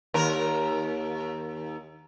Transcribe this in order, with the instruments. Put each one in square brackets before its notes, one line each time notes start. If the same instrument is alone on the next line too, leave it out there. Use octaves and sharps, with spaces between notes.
[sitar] D#2 A#4